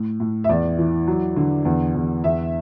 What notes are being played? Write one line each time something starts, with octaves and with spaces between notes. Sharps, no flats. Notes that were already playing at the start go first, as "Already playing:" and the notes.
Already playing: A2
A2
E5
E2 D5
E3
F#3
D3
E2
E2
E2 E5